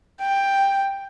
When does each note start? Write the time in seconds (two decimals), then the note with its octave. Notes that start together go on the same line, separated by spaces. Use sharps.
0.22 G5